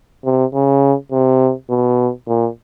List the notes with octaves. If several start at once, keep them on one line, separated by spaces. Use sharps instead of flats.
C3
C#3
C3
B2
A#2